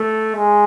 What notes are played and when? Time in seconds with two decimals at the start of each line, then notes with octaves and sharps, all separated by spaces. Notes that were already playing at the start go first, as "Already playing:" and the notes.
Already playing: A3
0.36 G#3